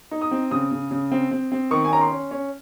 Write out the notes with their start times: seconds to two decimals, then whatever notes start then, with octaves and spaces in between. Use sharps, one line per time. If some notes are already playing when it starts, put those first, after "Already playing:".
0.11 D#4
0.22 D#6
0.31 C4
0.51 C#3 D#6
0.71 C#3
0.91 C#3
1.12 C4
1.31 C4
1.52 C4
1.71 D#3 C#6
1.85 G#5
1.91 C#4 A#5
2.01 C6
2.11 C#4
2.31 C#4